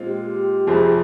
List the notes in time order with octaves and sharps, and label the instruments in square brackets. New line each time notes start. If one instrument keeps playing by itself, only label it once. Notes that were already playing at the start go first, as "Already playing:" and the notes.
Already playing: [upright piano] A#2 G#3 C4 F4
[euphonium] G4
[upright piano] F1 F2 C3 F3 C4 [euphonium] G#4